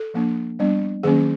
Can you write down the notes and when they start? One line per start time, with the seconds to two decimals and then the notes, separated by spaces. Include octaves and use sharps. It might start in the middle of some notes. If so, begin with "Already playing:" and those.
Already playing: A4
0.14 F3 A#3 D4
0.59 G3 B3 D4
1.03 D#3 F#3 A#3 C#4 G#4